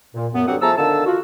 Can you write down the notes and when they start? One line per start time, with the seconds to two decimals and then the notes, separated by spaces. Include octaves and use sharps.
0.15 A#2
0.34 F#2 B3
0.48 G2 D3 F#3 C4 G4 F#5
0.62 F3 A3 G#4 A5 A#5 E6
0.78 D3 D#3 F5 A5 E6
1.06 F4 F#4